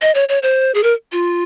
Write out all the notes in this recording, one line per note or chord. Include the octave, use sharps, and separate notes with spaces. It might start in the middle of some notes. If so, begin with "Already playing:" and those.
D#5
C#5
C#5
C5
G#4
A#4
F4